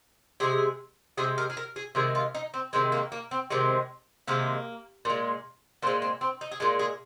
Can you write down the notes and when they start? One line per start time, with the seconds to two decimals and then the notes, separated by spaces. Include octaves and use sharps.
0.40 C3 G#3 G#4
1.17 C3 G#3 G#4
1.38 A#4
1.50 G#4
1.57 A#4
1.76 G#4
1.95 C3 D#3 G#3 G#4
2.15 F4
2.35 D#4
2.54 C4
2.73 C3 D#3 G#3 C4
2.92 A#3
3.12 A#3
3.31 C4
3.50 C3 D#3 G#3 C4
4.28 C3 D#3 G#3 A#3
5.05 A#2 G#3
5.82 A#2 C4
5.87 G#3
6.02 C4
6.21 C4
6.41 D#4
6.52 G#4
6.60 A#2 G#3 F4
6.79 G#4